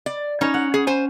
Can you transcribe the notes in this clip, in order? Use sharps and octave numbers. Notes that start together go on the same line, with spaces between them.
D5
C#4 D#4 C#5
F#5
G#4
C5 G#5